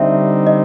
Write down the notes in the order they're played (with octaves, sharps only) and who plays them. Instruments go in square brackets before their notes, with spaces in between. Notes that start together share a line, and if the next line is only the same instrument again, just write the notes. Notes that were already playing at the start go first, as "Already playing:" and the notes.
Already playing: [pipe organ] D3 G3 C4 D#4 [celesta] E5
[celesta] D#5